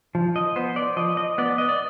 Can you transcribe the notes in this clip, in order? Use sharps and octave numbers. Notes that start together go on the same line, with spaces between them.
F3
D#5
B3 C5
D5
F3 D#5
D#5
B3 D5
D#5
D5